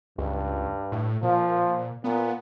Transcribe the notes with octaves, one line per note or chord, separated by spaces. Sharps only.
C#2 G2
A2
A#2 F3
A#2 B3